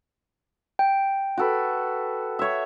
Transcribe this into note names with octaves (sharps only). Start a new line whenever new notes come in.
G5
F#4 A4 B4
C#5 E5